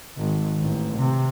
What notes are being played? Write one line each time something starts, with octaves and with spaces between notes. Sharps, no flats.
G#1
A1
C3